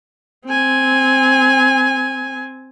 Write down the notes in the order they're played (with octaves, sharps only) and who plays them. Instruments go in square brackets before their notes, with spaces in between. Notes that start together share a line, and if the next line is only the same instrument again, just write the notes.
[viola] C4 G#5